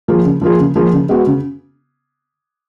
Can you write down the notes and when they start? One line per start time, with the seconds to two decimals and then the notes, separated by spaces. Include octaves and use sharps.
0.08 F3 A#3 F4 G#4
0.25 C#3
0.41 F3 A#3 F4 G#4
0.59 C#3
0.76 F3 A#3 F4 G#4
0.93 C#3
1.09 G#3 B3 F#4
1.26 C#3